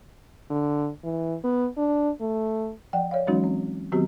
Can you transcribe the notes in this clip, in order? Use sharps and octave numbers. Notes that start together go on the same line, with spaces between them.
D3
E3
B3
D4
A3
F3 D5 F#5 G5
C#5 D5 F5
E3 F#3 G#3 C#4 D#4 F#4
C4
D#3 F#3 B3 C4 F#4 G4